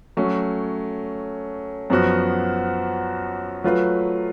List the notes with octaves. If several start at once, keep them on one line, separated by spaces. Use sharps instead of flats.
F#3 A3 C#4
F#2 F3 B3 F#4
F#3 A3 F4 B4